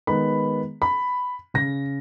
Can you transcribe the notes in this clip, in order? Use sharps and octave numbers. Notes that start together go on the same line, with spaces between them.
D#3 G#3 B3 B5
B5
C#3 A#6